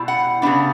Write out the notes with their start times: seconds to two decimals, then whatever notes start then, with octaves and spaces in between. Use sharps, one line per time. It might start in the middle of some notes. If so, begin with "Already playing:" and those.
Already playing: B2 G3 E4
0.08 F#5
0.42 C#3 G3 B3 D4